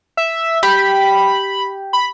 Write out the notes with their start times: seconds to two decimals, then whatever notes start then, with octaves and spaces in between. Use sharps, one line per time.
0.17 E5
0.63 G4 B5
1.93 B5